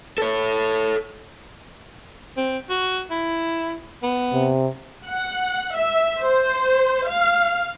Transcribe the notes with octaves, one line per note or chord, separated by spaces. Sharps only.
A4 C#5
C4
F#4
E4
B3
C3
F#5
E5
C5
F5